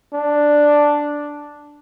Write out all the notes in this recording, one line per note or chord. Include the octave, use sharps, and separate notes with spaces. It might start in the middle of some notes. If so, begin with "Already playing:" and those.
D4